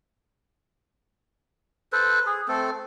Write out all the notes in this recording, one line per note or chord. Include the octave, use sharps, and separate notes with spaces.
A4 B4 C5
G#4
A3 C4 A4